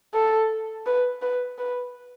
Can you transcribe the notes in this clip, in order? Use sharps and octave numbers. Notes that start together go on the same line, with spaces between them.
A4
B4
B4
B4